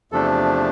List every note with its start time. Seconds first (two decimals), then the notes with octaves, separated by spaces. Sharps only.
0.12 E2 C3 F3 A3 D4 A4